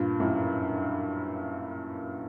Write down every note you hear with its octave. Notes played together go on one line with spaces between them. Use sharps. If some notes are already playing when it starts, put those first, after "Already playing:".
Already playing: G2 A#2
F#2 A2